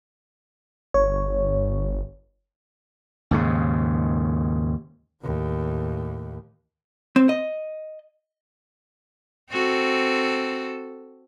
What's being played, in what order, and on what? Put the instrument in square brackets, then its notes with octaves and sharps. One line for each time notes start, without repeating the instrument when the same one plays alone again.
[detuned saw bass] G1 [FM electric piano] C#5
[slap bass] D#2 G#2 C#3
[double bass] D#2 A2
[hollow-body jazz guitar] C4
D#5
[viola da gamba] C4 F#4 A4